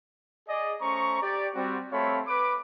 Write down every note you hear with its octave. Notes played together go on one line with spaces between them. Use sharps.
G#4 D5 D#5
A3 C#4 C5 A#5 C#6
G4 D5
G3 C4 F#4
A3 C4 A4 C#5 F5 B5
B4 D6